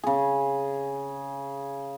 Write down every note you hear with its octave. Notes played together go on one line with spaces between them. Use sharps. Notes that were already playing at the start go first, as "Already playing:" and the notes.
C#3 G#4